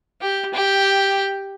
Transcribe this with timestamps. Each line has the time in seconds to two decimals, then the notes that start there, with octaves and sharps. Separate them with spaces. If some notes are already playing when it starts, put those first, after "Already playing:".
0.22 G4
0.54 G4